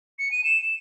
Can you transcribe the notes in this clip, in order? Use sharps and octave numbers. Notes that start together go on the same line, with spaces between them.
C#7
D#7
E7